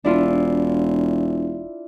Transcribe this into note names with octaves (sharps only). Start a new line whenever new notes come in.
E1 D4 E4 F4